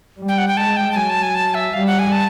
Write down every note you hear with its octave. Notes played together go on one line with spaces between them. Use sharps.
G3
G5
F#5
G5
G#3 A5
G5
A5
F#3 G#5
A5
G#5
A5
E5
G3 F5
F#5
G#5
A5